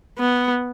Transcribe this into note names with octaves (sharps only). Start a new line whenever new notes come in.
B3